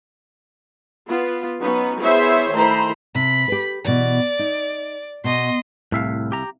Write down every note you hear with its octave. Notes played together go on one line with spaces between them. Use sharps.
B3 F4
F#3 B3 C#4 D#4
B3 E4 G#4 C5 C#5 E5
D#3 A3 E4 C5 A#5 B5
C3 B5
G4 B4
B2 E3 D5
D#4
B2 D#5 C6
C2 A2 E5 F5
G4 A#5